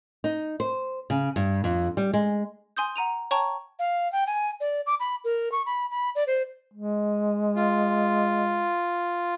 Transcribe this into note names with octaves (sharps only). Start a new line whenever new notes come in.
D#4
C5
C#3
G2
F2
G3
G#3
G#5 C6 D#6 G6
F#5 A#5 D#7 F7
C#5 G5 A5 A#5 C#6
F5
G5
G#5
D5
D6
B5
A#4
C#6
B5
B5
D5
C5
G#3
F4